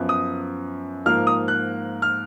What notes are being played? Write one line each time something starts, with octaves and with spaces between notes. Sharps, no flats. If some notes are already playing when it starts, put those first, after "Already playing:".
Already playing: F#2 F3 B3
D#6
G#2 F3 A#3 F4 F6
D#6
F#6
F6